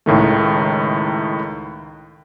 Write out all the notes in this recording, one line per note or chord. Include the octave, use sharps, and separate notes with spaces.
C#2 A2 D#3 A3